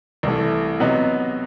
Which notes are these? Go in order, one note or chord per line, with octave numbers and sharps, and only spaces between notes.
C2 C3 E3 A3
C3 F#3 B3 D#4